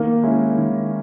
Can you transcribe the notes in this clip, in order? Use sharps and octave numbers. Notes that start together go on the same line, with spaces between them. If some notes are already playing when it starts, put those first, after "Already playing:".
Already playing: D#3 A#3
G#3 C#4 E4
D#3